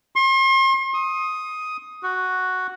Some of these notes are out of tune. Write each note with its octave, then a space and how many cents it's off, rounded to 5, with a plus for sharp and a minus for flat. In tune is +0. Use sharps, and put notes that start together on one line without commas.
C6 +40
D#6 +5
F#4 +0